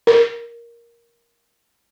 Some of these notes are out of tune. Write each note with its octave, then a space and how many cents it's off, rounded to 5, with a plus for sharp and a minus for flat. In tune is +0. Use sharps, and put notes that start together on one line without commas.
A#4 +5